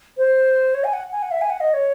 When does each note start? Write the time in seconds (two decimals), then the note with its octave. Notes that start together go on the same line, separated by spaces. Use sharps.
0.17 C5
0.74 C#5
0.84 G#5
0.93 F#5
1.12 G#5
1.23 F#5
1.31 E5
1.41 G#5
1.50 F#5
1.60 D#5
1.74 C#5